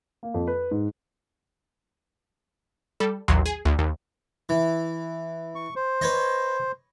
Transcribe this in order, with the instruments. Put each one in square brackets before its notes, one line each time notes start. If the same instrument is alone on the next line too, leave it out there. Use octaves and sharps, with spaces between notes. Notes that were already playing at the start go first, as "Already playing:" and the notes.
[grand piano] A#3
F2
B4
G#2
[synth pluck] G3 A4
A1 D#2 F#3 C6
G#4
D2
D#2
[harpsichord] E3
[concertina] C#6
C5
[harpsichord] B4 C#5 D#5